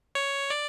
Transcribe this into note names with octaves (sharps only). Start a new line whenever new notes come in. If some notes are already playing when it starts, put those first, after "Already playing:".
C#5
D5